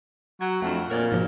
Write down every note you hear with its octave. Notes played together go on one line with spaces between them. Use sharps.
F#3 G#6
F2 A3 D4
A#2 A#4 C#5 D5
G#2 B2 F3